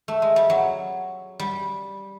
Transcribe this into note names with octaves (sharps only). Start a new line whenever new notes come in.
A3
G#3
G3
F#3
G3